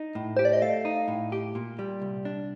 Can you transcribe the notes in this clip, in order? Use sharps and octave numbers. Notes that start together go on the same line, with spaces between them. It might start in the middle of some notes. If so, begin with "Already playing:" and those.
Already playing: D#4
A2
G4 C5
D5
D#5
A3 F5
D#4
A2
G4
A#2
G3
C2
D4